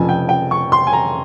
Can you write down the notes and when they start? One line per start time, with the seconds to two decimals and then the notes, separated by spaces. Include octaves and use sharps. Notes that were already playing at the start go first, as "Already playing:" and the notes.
Already playing: F1 F2 C#3 F3 G#5
0.09 G5
0.29 G5
0.51 C#6
0.72 C6
0.87 G#5
0.93 A#5